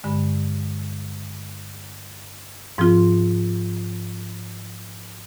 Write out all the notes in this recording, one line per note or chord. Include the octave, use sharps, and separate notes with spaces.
G2 D3 G#3
G#2 F3 C4 F4